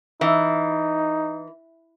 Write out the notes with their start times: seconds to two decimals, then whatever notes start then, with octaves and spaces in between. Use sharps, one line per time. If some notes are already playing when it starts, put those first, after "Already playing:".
0.21 E3 D#4